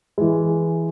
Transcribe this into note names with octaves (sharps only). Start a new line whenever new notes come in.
E3 G#3